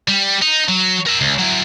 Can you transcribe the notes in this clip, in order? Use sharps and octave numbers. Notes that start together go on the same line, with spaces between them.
G3
D#4
F#3
A#4 E5
C#2
F#3 E4